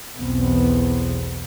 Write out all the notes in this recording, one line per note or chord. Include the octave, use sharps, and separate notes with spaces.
B1 E2 B3 C4